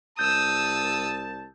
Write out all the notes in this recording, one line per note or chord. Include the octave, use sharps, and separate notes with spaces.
C2 A5 D#6 E6 G6